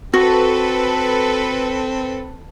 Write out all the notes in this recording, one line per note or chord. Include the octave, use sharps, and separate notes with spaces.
C4 F#4 A4 B4